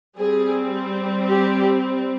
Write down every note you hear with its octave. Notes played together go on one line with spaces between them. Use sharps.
G3 C4 G#4
G4